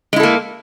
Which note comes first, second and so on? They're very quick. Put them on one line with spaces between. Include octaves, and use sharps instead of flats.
G#3 E4 A4 A#3